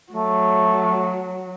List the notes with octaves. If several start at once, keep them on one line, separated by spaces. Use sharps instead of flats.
F#3 A3